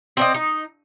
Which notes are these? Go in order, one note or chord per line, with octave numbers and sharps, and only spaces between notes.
C4 D5 D#5
D#4